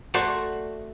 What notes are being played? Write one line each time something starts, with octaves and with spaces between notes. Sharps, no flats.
A3 F#4 C5 D5